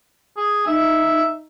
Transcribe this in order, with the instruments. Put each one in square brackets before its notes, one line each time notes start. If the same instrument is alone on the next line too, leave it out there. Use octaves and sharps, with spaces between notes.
[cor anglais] G#4
[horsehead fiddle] D#4 [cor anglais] E5